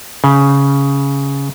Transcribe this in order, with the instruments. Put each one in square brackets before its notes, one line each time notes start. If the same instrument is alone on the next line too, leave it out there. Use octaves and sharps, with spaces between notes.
[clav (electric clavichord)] C#3